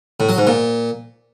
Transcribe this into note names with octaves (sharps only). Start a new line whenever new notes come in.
A2
F#3
G#2
A#2